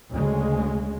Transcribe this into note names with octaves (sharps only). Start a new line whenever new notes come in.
D2 C#3 G#3